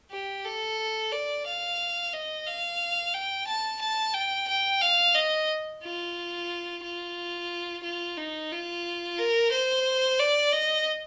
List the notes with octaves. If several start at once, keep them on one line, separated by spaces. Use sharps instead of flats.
G4
A4
D5
F5
D#5
F5
G5
A5
A5
G5
G5
F5
D#5
F4
F4
F4
D#4
F4
A#4
C5
D5
D#5